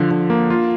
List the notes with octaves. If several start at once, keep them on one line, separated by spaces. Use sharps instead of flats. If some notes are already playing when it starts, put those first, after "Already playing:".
Already playing: D3 F3
D3
A#3
F4